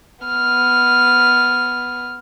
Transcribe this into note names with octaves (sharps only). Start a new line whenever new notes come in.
B3 F6